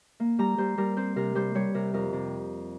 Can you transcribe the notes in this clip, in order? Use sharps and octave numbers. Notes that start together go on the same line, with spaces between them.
A#3
G3 A#5
G3 C5
G3 A#4
C4 C5
C3 A#4
G3 C5
G3 C#5
C3 A#4
F2 A#4
C3